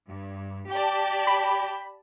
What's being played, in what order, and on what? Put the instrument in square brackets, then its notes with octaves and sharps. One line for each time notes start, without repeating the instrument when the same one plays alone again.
[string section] G2
[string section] G4 D5 A5 [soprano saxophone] G5
[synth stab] B5